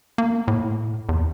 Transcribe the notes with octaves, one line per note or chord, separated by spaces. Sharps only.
A#3
A2
E2